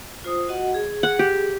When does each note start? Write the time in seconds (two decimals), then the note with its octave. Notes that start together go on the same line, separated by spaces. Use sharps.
0.24 F4 C5 D#6
0.48 F#4 D#5 F#5
0.74 G#4
1.03 F#5
1.19 G4